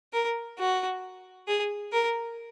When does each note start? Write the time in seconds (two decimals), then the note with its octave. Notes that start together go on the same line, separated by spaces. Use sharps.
0.13 A#4
0.59 F#4
1.47 G#4
1.92 A#4